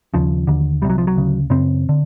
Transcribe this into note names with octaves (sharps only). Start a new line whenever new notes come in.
D#2 C#3 F3
D#2 D3
C2 C3 G3
F#3
F3
F#3
D2 C#3
F#2 C#3 C4
D3